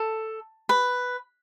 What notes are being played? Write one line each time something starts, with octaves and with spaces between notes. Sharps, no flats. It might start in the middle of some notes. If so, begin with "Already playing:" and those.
Already playing: A4
B4